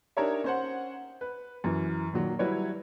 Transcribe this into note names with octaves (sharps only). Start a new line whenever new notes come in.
D4 D#4 G4 A#4 C#5 E5
C#4 C5 F#5
B4
F#2 E3
A#2 D#3 F#3
F#3 G3 E4 B4 C#5